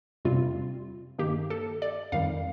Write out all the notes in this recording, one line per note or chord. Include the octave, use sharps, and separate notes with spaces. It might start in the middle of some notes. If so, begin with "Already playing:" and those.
F2 C3 G3 C4 F4
G2 D#3 A#3 G4
A4
D5
F2 D#3 G3 F5